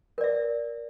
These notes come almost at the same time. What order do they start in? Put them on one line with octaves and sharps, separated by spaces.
A#4 D5 E5